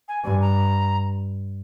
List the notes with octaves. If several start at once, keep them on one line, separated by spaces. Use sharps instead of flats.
G#5
G2 G#5
A#5